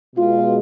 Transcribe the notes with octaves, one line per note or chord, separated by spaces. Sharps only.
B2 G#3 F4